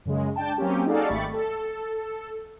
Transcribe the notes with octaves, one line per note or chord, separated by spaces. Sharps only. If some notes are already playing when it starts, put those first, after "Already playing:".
F#2 C#3 G#3
D4 G5 A5
F#3 A#3 C4 C#4 G4
D#4 F#4 G#4 A4 D5 F5
G#1 A3 G4 B5 C#6 A6
A4